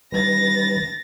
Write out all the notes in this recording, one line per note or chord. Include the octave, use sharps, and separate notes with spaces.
D#3 G3 B4 A6 A#6